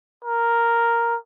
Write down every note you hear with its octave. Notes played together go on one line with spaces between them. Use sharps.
A#4